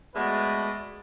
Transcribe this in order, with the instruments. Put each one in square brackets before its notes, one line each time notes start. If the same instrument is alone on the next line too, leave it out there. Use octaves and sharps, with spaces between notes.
[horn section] G#3 A3 B3 F#4 B4 D5